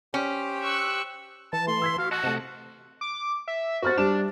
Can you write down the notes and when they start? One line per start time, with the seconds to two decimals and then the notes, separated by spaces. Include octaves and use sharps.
0.14 C#4 G4 C5 G5
0.64 C#6 E6 F#6
1.53 E3 A5
1.67 A3 C6
1.82 E6 G#6 B6
1.98 F#4 F5
2.11 F#4 D#5 F#5 A5
2.23 C3 A3
3.01 D6
3.48 E5
3.82 F#4 C5 F6 A6
3.98 G3 D4 E7